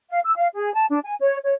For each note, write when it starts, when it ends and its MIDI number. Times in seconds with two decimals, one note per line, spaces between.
0.10 0.20 77
0.24 0.35 88
0.37 0.48 77
0.55 0.73 68
0.74 0.85 81
0.90 0.99 62
1.03 1.15 80
1.21 1.37 73
1.44 1.53 73